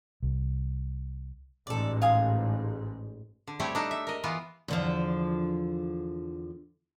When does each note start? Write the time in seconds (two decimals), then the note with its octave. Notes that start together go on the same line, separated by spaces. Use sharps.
0.23 C2
1.67 A1 G#2 A4 D5
2.02 F5 G#5 D#6
3.47 D3
3.59 G3 A3 C4 E4 G4 C#5
3.75 D4 D#4 A4
3.91 E5
4.07 A#4 D#5
4.24 E3 B3 F4
4.68 E2 D3 F3